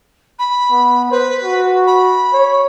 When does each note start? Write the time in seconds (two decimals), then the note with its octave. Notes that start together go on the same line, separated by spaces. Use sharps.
0.39 B5
0.71 B3
1.11 B4 C5
1.42 F#4
1.87 B5
2.33 C#5